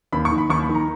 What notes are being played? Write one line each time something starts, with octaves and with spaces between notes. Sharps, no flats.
D#2 B5
C#6
D#3
B5
D#2 C#6
B5
D#3
A#5